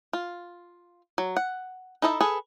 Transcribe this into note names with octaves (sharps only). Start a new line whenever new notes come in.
F4
F#3
F#5
D#4 E4 A4 D#5 E5
G#4 A4 B4